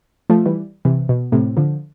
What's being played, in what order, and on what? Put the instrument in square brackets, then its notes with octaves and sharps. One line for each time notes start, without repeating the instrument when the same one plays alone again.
[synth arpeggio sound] F3 A3
E3 G3
C3 E3
B2
A2 C3
D3 F3